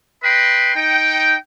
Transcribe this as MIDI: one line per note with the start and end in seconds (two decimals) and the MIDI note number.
0.24 0.75 71
0.24 0.75 75
0.24 0.75 79
0.24 0.75 83
0.24 0.75 84
0.75 1.37 63
0.75 1.37 79